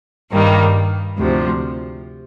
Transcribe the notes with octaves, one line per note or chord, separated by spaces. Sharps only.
G2 D#3 G3 A#3
D2 C3 F3